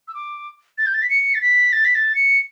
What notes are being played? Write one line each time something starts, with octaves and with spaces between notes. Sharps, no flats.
E6
D6
A6
G6
A6
B6
C#7
A6
B6
A6
B6
A6
C#7